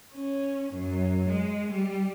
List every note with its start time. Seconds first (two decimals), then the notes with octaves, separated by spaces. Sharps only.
0.13 C#4
0.73 F#2
1.29 G#3
1.72 G3